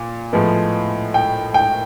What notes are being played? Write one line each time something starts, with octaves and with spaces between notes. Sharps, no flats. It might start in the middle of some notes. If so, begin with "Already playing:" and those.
Already playing: A#2
A2 F3 G#3 B3
G5
G5